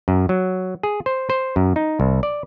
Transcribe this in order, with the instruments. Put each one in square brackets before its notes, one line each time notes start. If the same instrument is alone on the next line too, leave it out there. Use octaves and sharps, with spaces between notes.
[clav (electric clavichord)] F#2
F#3
G#4
C5
C5
F#2
D#4
C2
D5